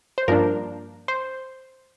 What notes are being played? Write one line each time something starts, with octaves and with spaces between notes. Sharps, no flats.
C5
G2 F3 A#3 D4 A#4
C5